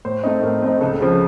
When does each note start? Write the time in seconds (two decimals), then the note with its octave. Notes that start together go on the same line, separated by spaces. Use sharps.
0.05 A2 C5
0.24 A3 C4 D#4
0.42 A2 A#4
0.62 A3 C4 D#4
0.81 C#2 A4
1.00 C#3 F3